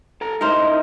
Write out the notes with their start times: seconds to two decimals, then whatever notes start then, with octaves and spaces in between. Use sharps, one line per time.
0.21 A4 A#5
0.41 D#4 E4 A#4 C5 D#5